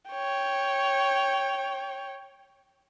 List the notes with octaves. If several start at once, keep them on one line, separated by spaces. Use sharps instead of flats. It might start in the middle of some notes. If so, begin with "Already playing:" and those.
C#5 G5